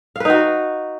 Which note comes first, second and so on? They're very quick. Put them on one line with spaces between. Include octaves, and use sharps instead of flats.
F5 B4 D#4 F#4